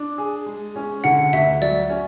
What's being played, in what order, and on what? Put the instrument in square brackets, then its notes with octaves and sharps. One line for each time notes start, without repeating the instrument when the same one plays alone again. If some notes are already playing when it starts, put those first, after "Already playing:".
Already playing: [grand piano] D4
G#4
G#3
C#4
[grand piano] D3 [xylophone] F#5
[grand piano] D2 [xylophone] E5
[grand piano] F#3 [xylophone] D5
[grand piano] C#4